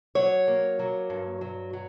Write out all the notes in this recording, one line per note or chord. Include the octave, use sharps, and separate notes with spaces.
F#3 C#5
A#3
F#3
G2
F#3
F#3